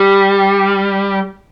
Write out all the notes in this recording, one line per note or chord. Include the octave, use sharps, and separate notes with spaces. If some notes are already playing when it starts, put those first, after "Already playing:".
Already playing: G3